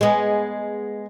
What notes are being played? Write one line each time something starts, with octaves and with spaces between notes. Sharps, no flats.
G#3 B3